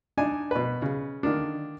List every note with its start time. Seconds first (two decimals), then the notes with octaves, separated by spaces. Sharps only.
0.17 D4 D#4 G#5
0.51 B2 B4
0.82 C#3
1.23 D3 D#3 A#3 D4